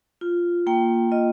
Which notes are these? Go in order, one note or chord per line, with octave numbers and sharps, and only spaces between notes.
F4
A#3 G5
F4 D#5